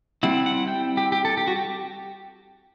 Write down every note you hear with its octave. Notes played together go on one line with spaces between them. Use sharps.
G3 C4 E4 F#5
F#5
G5
G4
G4
A4
G4
F#4
G4